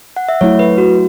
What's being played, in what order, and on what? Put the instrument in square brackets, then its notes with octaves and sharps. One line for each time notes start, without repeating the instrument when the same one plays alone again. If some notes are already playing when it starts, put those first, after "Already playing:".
[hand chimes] F#5
E5
[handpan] F#3 A3 E4 [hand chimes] C#5
[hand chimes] B4
F#4